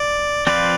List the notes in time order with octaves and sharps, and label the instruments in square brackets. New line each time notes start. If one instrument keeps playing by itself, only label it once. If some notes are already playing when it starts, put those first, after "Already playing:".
Already playing: [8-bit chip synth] D5
[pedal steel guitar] F3 C4 F4 B4 [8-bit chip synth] D5